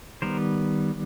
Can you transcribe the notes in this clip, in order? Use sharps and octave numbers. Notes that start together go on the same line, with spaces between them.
D#3 G3 B3 A#4 C5